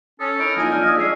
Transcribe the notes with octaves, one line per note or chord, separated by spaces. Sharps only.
C#4 A4 D#6
D#4 E4 A#4 G6 D7
F3 A#3 D#4 D#5 G#5
F3 D4 F6 G6
D#5 D#6 E6
G#3 C#4 G#4 D5 E5 C7